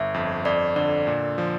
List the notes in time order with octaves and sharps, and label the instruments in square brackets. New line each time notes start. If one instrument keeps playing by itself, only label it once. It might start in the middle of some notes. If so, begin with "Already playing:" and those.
Already playing: [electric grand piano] G1 [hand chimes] E5
[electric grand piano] F2
[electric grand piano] F2 [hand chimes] D5
[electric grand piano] D3 [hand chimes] D5
[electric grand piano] A#2
F3